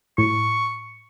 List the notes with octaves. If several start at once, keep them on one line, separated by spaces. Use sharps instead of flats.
A2 C#6